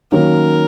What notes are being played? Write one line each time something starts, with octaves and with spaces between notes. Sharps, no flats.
D#3 F#3 A#3 C#4 A#4